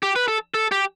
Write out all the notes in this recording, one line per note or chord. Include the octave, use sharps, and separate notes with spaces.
G4
B4
A4
A4
G4